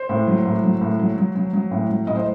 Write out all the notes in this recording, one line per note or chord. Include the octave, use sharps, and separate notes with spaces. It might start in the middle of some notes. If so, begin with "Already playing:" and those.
Already playing: C5
A2
F#3
A2
F#3
A2
F#3
F#3
F#3
F#3
A2
F#3
A2 D#5
C5